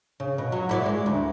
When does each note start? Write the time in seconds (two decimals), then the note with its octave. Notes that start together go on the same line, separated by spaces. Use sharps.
0.20 C#3
0.38 B2
0.52 F#3
0.69 E4 C#5 D5
0.86 G#3
1.06 D2